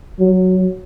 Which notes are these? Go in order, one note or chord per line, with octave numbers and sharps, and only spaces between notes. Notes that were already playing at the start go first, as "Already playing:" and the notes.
F#3